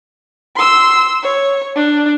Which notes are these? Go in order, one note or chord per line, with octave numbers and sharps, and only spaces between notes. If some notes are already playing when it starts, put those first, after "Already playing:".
C6 E6
C#5
D4